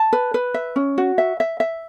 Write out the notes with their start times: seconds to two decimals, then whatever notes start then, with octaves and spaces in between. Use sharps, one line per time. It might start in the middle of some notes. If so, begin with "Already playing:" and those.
Already playing: A5
0.13 B4
0.34 B4
0.54 E5
0.76 C#4
0.98 F#4
1.18 E5
1.40 E5
1.60 E5